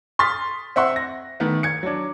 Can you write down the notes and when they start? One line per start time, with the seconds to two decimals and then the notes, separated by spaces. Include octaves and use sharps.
0.19 C6 D#6 F6 A6 B6
0.76 C4 E5 F#5 C6
0.96 A#6
1.40 D#3 A3 B3
1.63 G#6 C#7
1.83 F#3 D4